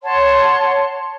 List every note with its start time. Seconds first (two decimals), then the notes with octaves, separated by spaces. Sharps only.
0.03 C#5 F#5 A5 C6